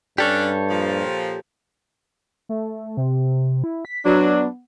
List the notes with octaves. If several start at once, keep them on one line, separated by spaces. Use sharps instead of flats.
G2 C#4 D4 G4 A4 C#5
A#2 F3
A3
C3
E4
B6
F#3 B3 D4